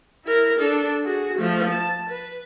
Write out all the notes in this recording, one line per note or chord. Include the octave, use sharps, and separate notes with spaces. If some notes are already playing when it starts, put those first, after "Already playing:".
E4 A#4
D4 A4
F#4 G#4
F3 A3
A5
B4